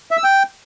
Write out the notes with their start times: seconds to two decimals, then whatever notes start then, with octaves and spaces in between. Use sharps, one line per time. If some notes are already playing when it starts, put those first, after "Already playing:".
0.11 E5
0.17 E6
0.24 G5